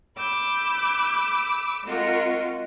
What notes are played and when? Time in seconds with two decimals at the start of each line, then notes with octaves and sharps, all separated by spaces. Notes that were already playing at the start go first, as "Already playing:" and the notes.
0.17 B5 D6 E6 G6
1.84 G#3 C4 F4 F#4 A#4 D#5